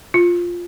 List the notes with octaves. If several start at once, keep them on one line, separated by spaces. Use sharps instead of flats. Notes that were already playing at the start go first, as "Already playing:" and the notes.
F4